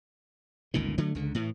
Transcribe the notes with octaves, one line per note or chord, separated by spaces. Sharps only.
G1 C#2 A#2 D#3
D3 F#3 A3
C#2 D3
A2 E3